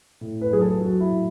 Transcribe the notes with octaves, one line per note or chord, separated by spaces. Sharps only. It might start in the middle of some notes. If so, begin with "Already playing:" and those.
A2
B4
F#3 G#4
A4
F#3 F#4
E4
A2